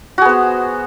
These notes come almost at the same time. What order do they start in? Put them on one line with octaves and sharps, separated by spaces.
F#4 G#4 B3 C5